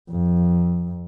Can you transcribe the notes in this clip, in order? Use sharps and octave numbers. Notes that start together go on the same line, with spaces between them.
F2